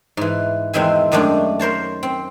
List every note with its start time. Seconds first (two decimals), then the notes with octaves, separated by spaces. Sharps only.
0.17 G#2 E3
0.73 E2 D#3 G#3 C4 E5 G#5
1.12 F#2 D#3 G#3 A3 D4
1.59 A#4 C5 C#5 A5
2.03 C4